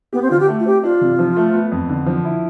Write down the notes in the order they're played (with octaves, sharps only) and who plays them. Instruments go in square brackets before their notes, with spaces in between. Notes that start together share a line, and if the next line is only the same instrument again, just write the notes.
[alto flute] B3 [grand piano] G4
[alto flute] C4
[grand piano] D3 [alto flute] F4
[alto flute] G4
[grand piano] A3
[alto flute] F4
[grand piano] C4 [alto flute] G4
[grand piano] D4 [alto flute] F4
[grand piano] C3
F3
A3
B3
F2
D3
F3
E4